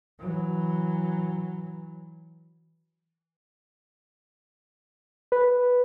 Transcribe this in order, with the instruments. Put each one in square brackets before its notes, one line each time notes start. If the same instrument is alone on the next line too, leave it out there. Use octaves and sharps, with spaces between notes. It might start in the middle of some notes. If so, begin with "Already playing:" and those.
[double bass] E3 F#3
[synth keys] B4